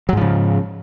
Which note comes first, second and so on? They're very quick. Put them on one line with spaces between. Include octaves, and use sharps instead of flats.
F#3 G#2 F3 C#3